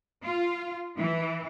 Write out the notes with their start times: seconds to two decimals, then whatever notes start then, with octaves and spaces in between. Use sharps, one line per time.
0.23 F4
0.97 E3